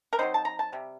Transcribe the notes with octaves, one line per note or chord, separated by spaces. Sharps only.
A#4
F#3 A3 C4 D#4 C5
A5
A#5
A5
C3 G3